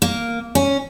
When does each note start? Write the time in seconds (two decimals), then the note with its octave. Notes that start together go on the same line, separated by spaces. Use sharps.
0.02 A#3
0.55 C#4